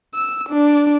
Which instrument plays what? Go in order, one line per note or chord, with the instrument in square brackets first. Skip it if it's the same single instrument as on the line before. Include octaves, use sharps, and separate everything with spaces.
[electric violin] E6
D4